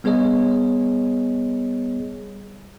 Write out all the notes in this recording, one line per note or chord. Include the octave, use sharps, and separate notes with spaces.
G3 B3 G#4 C#5 D#5